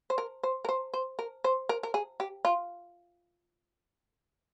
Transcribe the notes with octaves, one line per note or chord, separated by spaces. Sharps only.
C5
A#4
C5
A#4
C5
C5
A#4
C5
A#4
A#4
G#4
G4
F4